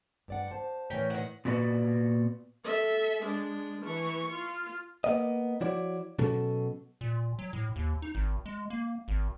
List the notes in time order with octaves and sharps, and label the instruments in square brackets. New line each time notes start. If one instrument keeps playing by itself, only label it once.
[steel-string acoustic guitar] G2 D5 F#5
C5 A5
[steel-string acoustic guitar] A2 E3 [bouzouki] C#4 A#4 G5
[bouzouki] D#3 F#5
[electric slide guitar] A#2 B3 F#4 B4 D5
[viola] A4 E5
G#3 D4
E3 C#6
F4
[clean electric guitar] A#3 B3 D#5
F3 E4 F#4 C#5 D5
B2 F#3 C#4 A4
[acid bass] A#2
F#3
A2
D#2
D#4
G#1
G#3
A#3
G#1